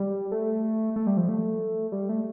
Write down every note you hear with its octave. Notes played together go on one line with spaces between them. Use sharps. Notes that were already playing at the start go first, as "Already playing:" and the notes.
Already playing: G3
A3
A3
G3
F3
A3
G3
A3